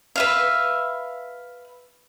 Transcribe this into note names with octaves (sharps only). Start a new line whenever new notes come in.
B4 E5 F5